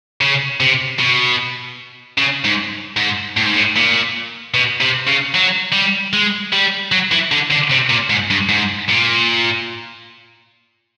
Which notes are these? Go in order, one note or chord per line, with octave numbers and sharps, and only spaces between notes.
C#3
C3
B2
C#3
G#2
G#2
A2
G#2
A2
A#2
B2
C3
C#3
F#3
G3
G#3
G3
F#3
E3
D3
D3
C3
A#2
G#2
G2
G#2
A#2